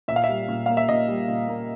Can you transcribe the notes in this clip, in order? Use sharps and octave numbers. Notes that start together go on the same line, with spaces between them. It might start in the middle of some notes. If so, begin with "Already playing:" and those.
A#2 E5
F5
E5
G3
A#2
A#3 F5
E5
A#2 D#5
G3
A#2
A#3